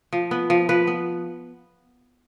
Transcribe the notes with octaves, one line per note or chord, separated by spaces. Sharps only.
F3
B3
F3
F3 B4
B3